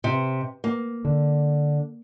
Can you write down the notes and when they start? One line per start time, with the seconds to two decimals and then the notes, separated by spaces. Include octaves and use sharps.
0.04 C3
0.64 A#3
1.05 D3